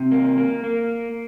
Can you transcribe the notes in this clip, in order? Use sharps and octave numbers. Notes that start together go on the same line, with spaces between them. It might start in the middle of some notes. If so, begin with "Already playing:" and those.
Already playing: C3
A#3
A#3
A#3